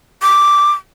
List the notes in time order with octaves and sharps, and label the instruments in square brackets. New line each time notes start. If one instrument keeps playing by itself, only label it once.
[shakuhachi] D6